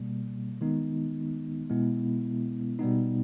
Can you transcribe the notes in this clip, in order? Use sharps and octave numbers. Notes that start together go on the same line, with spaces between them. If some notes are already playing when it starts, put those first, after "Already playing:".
Already playing: B2 G3 A#3
D#3 G#3 B3 D#4
B2 G#3 B3 E4
B2 G3 B3 D#4